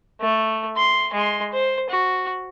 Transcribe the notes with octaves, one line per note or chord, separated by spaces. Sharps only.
A3
C6
G#3 C6
C5
F#4